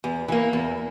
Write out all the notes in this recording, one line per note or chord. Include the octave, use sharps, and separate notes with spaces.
E2
E3 A#3
E2